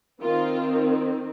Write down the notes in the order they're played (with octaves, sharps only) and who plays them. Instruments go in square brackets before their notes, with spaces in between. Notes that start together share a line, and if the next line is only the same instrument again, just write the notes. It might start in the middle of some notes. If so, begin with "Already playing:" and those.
[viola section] D#3 C4 F4